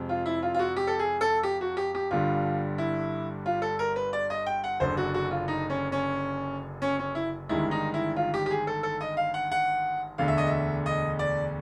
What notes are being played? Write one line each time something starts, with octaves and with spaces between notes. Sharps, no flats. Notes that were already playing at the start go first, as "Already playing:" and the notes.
Already playing: F2 C3 F3 G#3
F4
E4
F4
F4
F#4
G4
A4
G#4
A4
G4
F#4
G4
G4
G1 G2 D3 G3 F4
E4
F4
A4
A#4
B4
D5
D#5
G5
F#5
F#1 F#2 D3 C5
F#4
F#4
F4
D#4
C#4
C#4
C#4
C#4
E4
G1 G2 D#3 G#3 E4
D#4
E4
F4
G4
G4
G#4
A4
A4
D#5
F5
F#5
F#5
E1 D2 D3 F5
E5
D#5
E5
D#5
D5